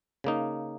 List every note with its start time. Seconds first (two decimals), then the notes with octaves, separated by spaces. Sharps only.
0.24 C#3 A#3 D#4